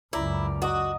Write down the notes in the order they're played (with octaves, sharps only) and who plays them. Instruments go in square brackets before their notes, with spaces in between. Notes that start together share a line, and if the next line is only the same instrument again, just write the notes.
[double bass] C#2 F#2 [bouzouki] E4 [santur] D5 A#5
[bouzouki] F#4 [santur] D#5 D#6